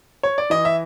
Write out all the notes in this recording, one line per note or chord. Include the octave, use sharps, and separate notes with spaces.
C#5
D5
E3 D#5
E5